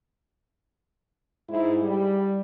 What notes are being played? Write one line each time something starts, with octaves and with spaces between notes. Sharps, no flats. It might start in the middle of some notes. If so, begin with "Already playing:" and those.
G#2 E4
G3